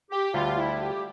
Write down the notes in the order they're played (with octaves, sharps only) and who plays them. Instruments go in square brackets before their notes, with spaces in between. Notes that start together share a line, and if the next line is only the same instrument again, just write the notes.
[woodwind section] G4
[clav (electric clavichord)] D2 D3 G3 [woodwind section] F4
[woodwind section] E4
G4